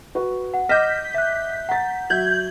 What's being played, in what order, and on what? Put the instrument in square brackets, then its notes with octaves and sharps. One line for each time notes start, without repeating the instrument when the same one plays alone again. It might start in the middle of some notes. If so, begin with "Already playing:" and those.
[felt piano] F#4 B4
[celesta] F#5
[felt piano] D#5 F#5 D6 [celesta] F6 A#6 E7 [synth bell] G6 B6
[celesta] E5 F#6
[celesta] F#5 [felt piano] A#5 A6
[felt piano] F#3 E5 [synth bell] G6 G#6 F#7